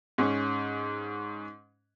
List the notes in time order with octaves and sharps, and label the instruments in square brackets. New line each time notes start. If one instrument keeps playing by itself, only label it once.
[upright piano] G#2 C#4